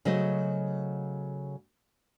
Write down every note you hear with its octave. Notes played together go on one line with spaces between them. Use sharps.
C#3 F#3 A3 C5 D#5